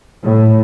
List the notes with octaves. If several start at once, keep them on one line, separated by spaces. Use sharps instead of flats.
A2